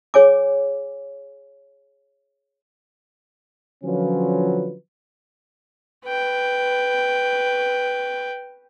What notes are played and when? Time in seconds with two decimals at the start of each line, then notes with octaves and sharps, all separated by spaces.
0.14 G#4 C#5 G#5 D6
3.84 D3 F3 F#3 C#4 F4 B4
6.06 B4 G5